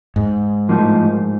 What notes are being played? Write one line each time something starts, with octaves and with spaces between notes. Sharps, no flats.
G#2
A2 F3 A#3 D#4